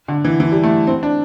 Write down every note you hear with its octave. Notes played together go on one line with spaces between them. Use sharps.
D3
E3
E3
G3
A3
C4
D4